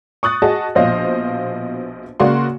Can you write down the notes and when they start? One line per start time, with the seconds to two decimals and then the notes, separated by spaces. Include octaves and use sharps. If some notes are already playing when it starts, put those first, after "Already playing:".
0.23 C#6 D#6 F#6 A6
0.42 F#4 G#4 D#5 A5
0.75 A#1 B2 F3 C5 D#5 F5
2.20 C#3 A#3 F#4 D5 F5 C6